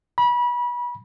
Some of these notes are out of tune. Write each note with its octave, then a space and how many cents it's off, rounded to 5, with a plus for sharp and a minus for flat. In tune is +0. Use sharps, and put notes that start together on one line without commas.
B5 -30